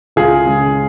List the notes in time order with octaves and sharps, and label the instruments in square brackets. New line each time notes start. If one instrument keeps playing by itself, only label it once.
[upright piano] C#2 F4 G#4
C#3 G#3